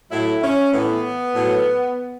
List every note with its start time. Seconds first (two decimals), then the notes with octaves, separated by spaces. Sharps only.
0.11 A2 F#3 E4
0.42 C#4
0.72 A2 E3 B3
1.35 A2 F#3